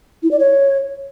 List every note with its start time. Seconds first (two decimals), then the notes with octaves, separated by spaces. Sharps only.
0.23 E4
0.31 D5
0.39 C#5